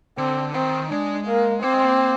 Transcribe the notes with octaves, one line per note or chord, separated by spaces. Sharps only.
D3 C4
D#3 C4
G#3 D4
A#3
A#3 C4
G#3
A#3